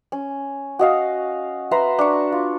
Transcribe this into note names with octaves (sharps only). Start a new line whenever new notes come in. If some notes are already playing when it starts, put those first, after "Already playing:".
C#4
F#4 D#5 F5
B4 E5 A#5 C6
D4 C#6
F4